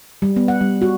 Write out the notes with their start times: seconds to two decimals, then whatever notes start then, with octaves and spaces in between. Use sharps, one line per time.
0.22 G3
0.36 B3
0.48 F#5
0.61 G3
0.82 F#4